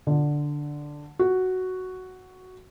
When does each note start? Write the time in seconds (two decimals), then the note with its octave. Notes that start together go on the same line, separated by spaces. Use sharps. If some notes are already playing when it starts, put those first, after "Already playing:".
0.07 D3
1.19 F#4